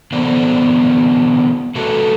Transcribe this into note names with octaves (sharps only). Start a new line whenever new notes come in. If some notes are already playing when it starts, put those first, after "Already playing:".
D3 E3 B3 C4 D4 C5
A3 F#4 A4 B4 D#5